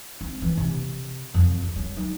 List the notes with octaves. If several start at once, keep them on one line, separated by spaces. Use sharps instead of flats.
C4
E3
C3
F2
E2
F#3
D#4